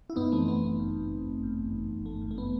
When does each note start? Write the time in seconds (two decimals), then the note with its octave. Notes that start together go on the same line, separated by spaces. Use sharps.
0.10 E4
0.16 F#2 B3 D#4
0.32 E3 A3 C4
0.48 E3 B3
0.64 G1 B3
0.80 F#2
0.96 F#2
1.11 G1
1.27 G1
1.43 F#2
1.59 G1
1.75 G1
1.90 G1
2.06 G1 A3
2.21 F#2
2.31 A3
2.38 B3